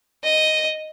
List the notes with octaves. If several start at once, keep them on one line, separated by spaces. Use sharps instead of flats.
D#5